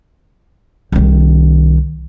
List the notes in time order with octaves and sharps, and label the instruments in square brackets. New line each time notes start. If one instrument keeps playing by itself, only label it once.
[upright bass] C2 D#3